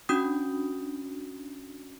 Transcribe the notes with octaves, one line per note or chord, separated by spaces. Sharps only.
C#4 D4 F#4 D#6 G6